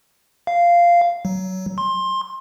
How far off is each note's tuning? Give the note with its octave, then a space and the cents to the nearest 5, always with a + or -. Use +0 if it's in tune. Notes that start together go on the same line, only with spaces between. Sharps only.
F5 -10
F#3 +20
C6 +20